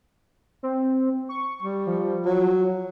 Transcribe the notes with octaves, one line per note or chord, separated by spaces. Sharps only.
C4
C#6
G3
F3
F#3